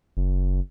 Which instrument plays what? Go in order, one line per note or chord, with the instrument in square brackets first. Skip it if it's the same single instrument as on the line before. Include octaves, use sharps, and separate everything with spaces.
[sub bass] F#1